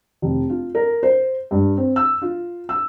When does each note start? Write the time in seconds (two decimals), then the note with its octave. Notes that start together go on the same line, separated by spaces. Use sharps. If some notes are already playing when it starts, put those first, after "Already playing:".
0.22 F1
0.49 F4
0.75 A#4
1.03 C5
1.51 G2
1.77 C4
1.96 E6
2.22 F4
2.69 E6